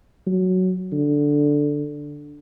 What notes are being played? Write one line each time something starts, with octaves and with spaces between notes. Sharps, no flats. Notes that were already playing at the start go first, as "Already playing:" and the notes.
F#3
D3